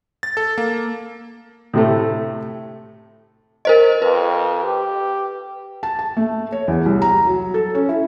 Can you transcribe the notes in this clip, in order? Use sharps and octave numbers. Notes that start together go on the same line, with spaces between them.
A6
A4
A#3
A2 C3 A3
A#4 C5 D#5
F2 B4
G4
A5
A5
A3
C#5
E2
C2
A#5
F#3
A4
C#4
E4